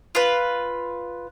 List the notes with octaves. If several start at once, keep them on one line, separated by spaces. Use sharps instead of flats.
F4 B4